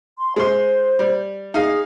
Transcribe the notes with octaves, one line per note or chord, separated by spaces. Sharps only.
C6
G#3 C5 C6
G3
D#4 G#4 D#5 F5